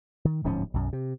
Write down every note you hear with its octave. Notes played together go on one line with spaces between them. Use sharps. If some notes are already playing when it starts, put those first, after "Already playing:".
D#3
D1 G#2 F3 C#4
B1 F#2
C3